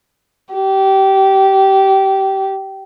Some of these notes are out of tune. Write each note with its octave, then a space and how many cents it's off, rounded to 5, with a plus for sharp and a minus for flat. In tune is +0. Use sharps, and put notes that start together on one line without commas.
G4 -20